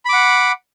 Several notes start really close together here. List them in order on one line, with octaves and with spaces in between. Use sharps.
B5 D6 F#5